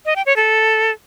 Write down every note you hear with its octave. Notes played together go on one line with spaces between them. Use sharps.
D#5
G5
C#5
A4